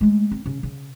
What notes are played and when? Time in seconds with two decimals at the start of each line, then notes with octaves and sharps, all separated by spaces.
0.01 G#3 A3
0.32 C4
0.46 C#3 C#4
0.63 C#3